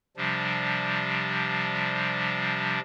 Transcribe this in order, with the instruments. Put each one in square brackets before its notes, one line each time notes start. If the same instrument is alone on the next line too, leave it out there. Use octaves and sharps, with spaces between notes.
[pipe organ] C3 F3 G3 D4